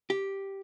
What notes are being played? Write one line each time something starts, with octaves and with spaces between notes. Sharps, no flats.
G4